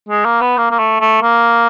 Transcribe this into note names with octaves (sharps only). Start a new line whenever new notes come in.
G#3
A#3
B3
A#3
A#3
A3
A3
A#3